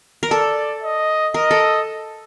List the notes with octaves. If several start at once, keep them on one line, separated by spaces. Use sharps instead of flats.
A#4
A4 D5
D#5
A#4 D#5
A4